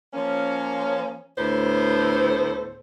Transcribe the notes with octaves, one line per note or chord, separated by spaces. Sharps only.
F3 A#3 C#4
D2 A2 B3 A4 C5